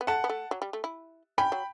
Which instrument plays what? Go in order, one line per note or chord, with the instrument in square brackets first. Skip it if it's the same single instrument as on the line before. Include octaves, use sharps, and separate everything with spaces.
[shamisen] B3
[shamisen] A3 [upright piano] F#5 A5
[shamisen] B3
A3
F#3
G3
A3
E4
[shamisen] C#4 [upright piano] G5 B5
[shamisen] F#3